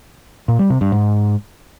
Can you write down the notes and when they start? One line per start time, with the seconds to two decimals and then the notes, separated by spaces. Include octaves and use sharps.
0.48 A#2
0.59 G3
0.70 C3
0.81 G2
0.92 G#2